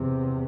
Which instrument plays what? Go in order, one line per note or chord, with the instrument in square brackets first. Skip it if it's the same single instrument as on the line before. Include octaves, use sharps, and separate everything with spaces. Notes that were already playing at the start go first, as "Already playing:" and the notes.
Already playing: [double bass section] E2 C3